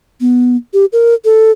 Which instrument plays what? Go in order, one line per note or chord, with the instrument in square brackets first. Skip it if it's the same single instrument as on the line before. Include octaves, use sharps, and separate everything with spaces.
[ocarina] B3
G4
A#4
A4